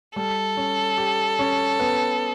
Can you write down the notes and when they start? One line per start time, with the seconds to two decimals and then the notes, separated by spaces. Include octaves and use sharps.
0.16 G3 A4
0.57 C#4
0.98 G4
1.39 C#4
1.80 B3